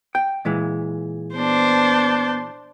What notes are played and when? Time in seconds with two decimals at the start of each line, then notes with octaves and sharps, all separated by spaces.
0.15 G5
0.45 A#2 E3 G#3
1.36 B3 D4 C5